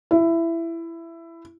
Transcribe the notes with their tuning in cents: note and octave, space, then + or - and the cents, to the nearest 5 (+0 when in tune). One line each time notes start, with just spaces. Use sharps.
E4 +15